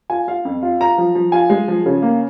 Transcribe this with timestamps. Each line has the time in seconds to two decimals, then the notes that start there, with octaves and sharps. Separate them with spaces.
0.10 F4 G#5
0.28 F4 F5
0.45 F2
0.63 F4
0.80 F4 A#5
0.98 F3
1.15 F3
1.32 F4 G#5
1.50 G#3
1.68 F3
1.86 C#3
2.02 A#3